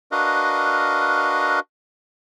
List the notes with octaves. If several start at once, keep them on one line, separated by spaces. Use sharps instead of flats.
D4 F#4 A#4 B4 D#5 F5